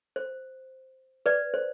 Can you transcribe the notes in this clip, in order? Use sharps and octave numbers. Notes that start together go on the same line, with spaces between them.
C5
B4 D5
C5